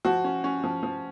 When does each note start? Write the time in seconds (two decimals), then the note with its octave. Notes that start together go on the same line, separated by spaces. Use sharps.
0.05 F3 F#4
0.24 C#4
0.44 C#4
0.64 F3
0.83 F3